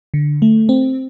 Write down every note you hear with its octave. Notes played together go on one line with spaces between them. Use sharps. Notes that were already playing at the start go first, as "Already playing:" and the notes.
D3
A3
C4